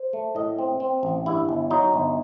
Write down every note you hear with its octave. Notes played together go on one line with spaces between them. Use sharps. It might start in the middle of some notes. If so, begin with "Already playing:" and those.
Already playing: C5
A3
A2 D#5
C4
C4
A1
G2 E4
G1
F#3 D#4
G1